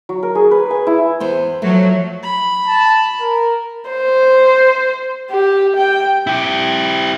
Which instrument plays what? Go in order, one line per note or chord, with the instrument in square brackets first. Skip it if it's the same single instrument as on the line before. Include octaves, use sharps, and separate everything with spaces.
[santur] F#3
A#4
G#4
B4
G#5
E4
[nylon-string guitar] E2 B3 C5
[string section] F3 F#3 [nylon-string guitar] A3
[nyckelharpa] B5
[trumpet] A5
A#4
[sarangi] C5
G4
G5
[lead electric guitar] E4 G4